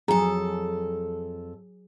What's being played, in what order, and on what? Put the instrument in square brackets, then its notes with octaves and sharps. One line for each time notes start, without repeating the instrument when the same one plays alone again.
[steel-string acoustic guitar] F2 A4 [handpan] F#3 G#4 [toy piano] A#5